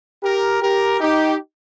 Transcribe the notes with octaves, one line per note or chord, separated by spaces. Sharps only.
G4 A#4
G4 A#4
D#4 G4